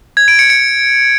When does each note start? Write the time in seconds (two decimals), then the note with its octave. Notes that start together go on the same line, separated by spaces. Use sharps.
0.17 G#6
0.28 D7
0.39 C#7
0.50 C#7